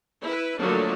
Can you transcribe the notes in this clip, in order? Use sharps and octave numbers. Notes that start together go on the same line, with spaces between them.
E4 B4
D3 F3 F#3 A3 A#3 D4